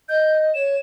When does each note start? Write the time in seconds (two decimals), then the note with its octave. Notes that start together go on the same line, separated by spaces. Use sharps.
0.09 D#5 G6
0.54 C#5 E7